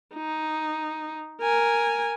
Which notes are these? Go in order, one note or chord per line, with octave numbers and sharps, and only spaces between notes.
D#4
A#4 G#5